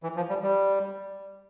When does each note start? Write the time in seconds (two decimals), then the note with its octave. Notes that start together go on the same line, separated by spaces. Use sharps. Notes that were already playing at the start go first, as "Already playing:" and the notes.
0.03 E3
0.17 F3
0.29 G3
0.43 G3